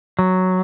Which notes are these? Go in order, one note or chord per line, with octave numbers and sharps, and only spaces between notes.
F#3